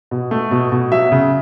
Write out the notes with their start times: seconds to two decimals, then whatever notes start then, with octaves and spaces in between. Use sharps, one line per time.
0.11 B2
0.31 A3
0.51 B2
0.72 B2
0.92 F#3 E5
1.12 C#3